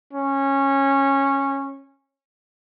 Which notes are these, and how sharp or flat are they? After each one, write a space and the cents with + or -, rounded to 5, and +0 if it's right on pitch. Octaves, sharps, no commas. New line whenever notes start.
C#4 -15